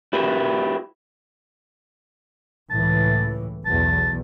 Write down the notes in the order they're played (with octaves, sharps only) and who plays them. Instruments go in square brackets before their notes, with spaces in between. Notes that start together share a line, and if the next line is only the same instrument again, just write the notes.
[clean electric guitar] E4 F#4 G4 B4
[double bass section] C#2 A2 E3 [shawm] A5
[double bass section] B1 E2 [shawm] A5